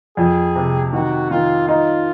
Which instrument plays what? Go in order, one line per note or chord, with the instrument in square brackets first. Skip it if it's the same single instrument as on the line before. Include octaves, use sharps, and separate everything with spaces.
[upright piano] F2 [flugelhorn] G#4
[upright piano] C3
[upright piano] D#3 [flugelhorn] F#4
[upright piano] D#3 [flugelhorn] F4
[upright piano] D#4 [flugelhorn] F4